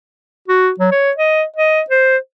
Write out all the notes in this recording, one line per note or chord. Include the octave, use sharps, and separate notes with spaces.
F#4
F#3
C#5
D#5
D#5
C5